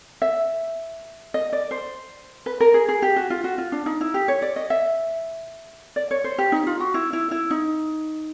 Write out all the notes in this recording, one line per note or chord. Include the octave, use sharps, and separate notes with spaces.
E5
D#5
D5
C5
B4
A#4
G#4
G#4
G4
F#4
F4
F#4
F4
D4
D#4
E4
G4
C#5
D5
D#5
E5
D5
C#5
C5
G4
D#4
F4
F#4
E4
E4
E4
D#4